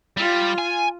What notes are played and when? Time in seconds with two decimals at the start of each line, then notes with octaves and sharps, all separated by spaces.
0.17 G3 F4
0.59 G#5